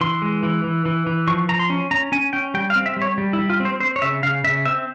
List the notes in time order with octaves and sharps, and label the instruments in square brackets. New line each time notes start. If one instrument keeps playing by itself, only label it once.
[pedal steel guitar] E3 C6
G#3
E3
E3
E3
E3
F3 C#6
F3 A#5
C6
C#4
C#4 A#5
C#4 G#5
C#4 G5
G3 G5
F5
C4
E5
G3
C#5
G3
E4
G3
F4
C4
C5
C4 C5
C#5
C#3 E5
C#3 F5
C#3 E5
C4 E5